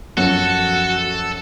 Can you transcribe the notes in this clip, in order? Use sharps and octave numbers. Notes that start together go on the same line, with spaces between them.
F#2 F3 F#4 A4